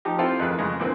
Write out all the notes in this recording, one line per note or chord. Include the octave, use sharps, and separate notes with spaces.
F3 D#4 G4
C4 E4 F4 A4 F5 G5
F2 D#3 E3 G#4 B4
F2 C#3 G#3
A#2 D3 E3 C4